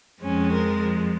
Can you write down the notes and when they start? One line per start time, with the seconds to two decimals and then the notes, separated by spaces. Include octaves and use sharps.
0.22 F2 F3 G#3 C#4
0.51 A#4